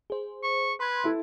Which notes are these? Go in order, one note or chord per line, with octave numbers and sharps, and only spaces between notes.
G#4 C5
C#6
B4 C6 G#6
E4 A4